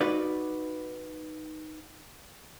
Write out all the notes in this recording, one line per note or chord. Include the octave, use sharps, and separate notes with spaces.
D#4 F#4 B4 D5